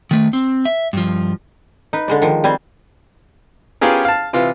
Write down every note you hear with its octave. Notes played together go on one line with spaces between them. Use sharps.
D#3 A3
C4
E5
G2 F3
D#4 B4
D3 G#3 D5
D#3 F3
G3 C4 D5 G#5 C6
B3 C#4 F4 G4 G#4 A#4
F5 A5
C3 E3 F4